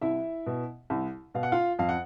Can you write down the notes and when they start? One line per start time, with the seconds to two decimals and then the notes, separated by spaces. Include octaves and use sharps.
0.02 C2 E4 E5
0.46 B2
0.90 C2
1.34 B2 F5
1.43 F#5
1.52 F4 F5
1.79 F2 F5
1.89 F#5